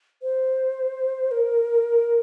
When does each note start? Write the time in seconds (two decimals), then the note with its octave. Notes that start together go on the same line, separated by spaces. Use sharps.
0.22 C5
1.31 A#4